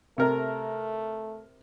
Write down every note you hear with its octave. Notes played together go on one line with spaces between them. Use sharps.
C3 A3 A#4